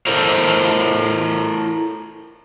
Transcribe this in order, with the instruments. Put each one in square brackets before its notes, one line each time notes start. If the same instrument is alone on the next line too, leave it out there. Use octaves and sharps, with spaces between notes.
[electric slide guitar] E4 A4 A#4 C5 C#5